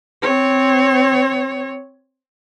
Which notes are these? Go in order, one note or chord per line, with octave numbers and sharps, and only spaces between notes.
C4 C#5